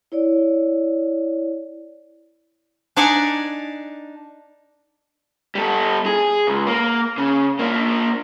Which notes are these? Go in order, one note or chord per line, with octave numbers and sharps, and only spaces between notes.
E4 C#5 D5
D4 D#4 D5 F#5 G#5
G3 A4
G#4
C#2
A#3
C#3
A#3 D4